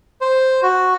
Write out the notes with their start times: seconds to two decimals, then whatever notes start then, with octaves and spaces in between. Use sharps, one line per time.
0.21 C5
0.62 F#4